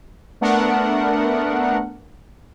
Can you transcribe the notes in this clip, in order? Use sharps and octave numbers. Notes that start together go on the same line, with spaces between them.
A3 B3 D4 A#4 F#5